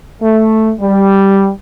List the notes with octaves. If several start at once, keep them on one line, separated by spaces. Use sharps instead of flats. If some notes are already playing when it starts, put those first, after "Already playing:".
A3
G3